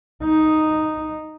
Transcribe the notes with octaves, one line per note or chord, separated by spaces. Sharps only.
D#4